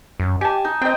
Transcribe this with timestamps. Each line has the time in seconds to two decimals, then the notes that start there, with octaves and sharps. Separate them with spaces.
0.20 F#2
0.41 G4 G#5 A5
0.65 D#4
0.82 C4 D#5 G5